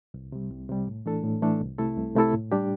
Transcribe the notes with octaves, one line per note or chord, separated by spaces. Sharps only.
C2
C3 G3
C2
C3 G3
A2
E3 A3 D4 A4
A2
E3 A3 D4 A4
C2
C3 A3 E4 A4
C2
C3 A3 E4 A4
A2
G3 D4 G4